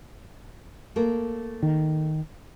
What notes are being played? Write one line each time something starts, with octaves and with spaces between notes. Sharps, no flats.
A3 A#3 A#4
D#3